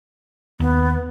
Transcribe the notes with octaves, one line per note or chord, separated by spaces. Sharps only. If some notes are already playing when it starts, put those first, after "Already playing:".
D#2 B3